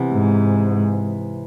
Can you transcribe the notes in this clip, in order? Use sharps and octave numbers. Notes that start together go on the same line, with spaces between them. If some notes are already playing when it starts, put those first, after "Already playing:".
Already playing: C3 E3 B3
G#2